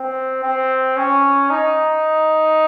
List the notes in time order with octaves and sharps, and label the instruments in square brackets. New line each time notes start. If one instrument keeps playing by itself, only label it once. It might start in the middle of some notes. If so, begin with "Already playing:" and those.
Already playing: [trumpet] C4
C4
C#4
D#4